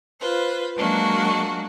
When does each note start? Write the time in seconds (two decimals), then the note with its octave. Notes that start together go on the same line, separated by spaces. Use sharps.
0.20 F4 B4 C5
0.77 F#3 G#3 A#3 D4 F#4